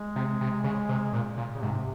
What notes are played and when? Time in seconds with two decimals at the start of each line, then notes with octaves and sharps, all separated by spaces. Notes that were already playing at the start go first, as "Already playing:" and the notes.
Already playing: G#3
0.16 C3
0.41 C3
0.64 C#3
0.89 C3
1.13 A#2
1.38 A#2
1.55 C#3
1.61 G#2 C3